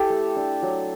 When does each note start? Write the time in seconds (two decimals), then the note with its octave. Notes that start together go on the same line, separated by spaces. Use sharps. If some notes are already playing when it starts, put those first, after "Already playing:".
Already playing: E4 G4 A4
0.10 A3
0.36 D4
0.62 F#3